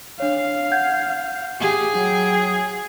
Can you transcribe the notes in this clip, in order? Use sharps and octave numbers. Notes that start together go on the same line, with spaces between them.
D4 C#5 F5
F#5 G6 G#6
G4 G#4
F#3 G5